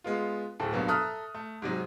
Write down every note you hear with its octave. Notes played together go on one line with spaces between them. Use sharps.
G#3 B3 F4
D1 A2 A4
C2 G2 B2 F#3 A#3 B3
A4 E5 A#5 D#6 F6 F#6
A3
G#2 C3 F#3